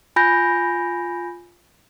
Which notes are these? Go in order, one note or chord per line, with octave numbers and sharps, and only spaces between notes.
F4 G#5 B5 G6 A#6